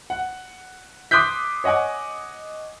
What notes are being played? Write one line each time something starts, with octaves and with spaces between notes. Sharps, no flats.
F#5
C6 D6 D#6 F#6 G6 B6
C#5 D#5 F#5 G#5 D6